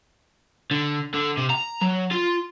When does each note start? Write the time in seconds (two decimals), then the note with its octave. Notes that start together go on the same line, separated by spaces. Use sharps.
0.71 D3
1.14 D3
1.37 C3
1.50 A#5
1.82 F#3
2.12 F4